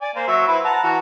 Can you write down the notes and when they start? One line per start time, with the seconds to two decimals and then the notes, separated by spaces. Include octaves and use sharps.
0.02 D5 G#5
0.16 A#3 C5
0.28 F#3 E5
0.48 E4 B4 C5
0.64 F#5 A5 A#5
0.83 E3 F#4